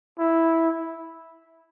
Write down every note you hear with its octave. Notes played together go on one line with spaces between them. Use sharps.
E4